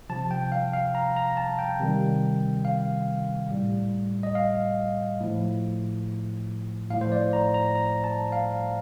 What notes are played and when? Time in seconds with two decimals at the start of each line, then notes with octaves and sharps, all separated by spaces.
0.10 C3 F3 A5
0.31 G5
0.52 F5
0.73 F5
0.95 A#5
1.16 A#5
1.37 A5
1.59 G5
1.79 C3 D#3 G3
2.65 F5
3.50 A2 G3
4.23 D#5
4.35 F5
5.20 A2 F3
6.90 A2 F5
6.93 F3
7.01 C5
7.12 D5
7.33 A#5
7.54 A#5
7.76 A#5
8.04 A5
8.32 F5